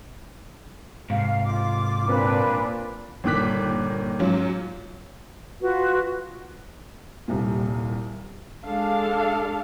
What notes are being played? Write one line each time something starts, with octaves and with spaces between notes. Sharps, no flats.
G#2 C3 F5
F4 D6
A#2 C4 D4 B4
G1 A#2 D#3 D6 F#6 B6
G#2 F#3 C#4 F4
F4 F#4 B4
D#1 C2 A#2
G#3 D4 A4 F5